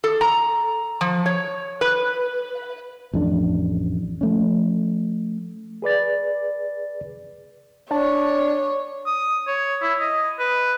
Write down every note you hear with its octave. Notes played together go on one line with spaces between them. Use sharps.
A4
A#5
F3
C#5
B4
A1 F2 A3 D4
F3 A3 C#4
G#4 B4 D5 A6
D4 C#5
D#6
C#5
E4
D#5
B4